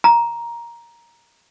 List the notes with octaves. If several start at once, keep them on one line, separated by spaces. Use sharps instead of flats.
A#5